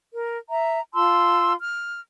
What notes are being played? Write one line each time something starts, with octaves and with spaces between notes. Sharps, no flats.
A#4
E5 A#5
F4 A5 C6 E6
F6